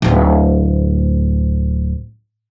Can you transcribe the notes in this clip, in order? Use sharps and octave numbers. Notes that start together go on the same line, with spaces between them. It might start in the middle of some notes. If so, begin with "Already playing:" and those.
D1 D2